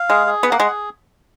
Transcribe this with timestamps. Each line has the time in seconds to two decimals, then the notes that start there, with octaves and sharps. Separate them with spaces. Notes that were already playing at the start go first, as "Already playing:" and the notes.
Already playing: F5
0.10 G#3 G#4
0.27 G#4
0.43 B3 F#5
0.52 A#3
0.60 G#3 G#4